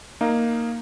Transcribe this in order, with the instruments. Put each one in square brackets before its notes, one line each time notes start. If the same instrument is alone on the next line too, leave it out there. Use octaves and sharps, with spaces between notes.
[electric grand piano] A#3 D#4 F5